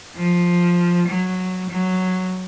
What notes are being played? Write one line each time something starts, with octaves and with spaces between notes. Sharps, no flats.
F3
F#3
F#3